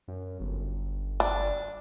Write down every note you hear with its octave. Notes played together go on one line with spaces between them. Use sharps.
F#2
G1
D4